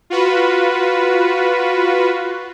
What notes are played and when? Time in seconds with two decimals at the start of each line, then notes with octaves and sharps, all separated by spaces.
0.10 F4 F#4 B4